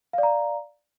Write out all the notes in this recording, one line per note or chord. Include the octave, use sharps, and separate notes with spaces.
D5 F5 A#5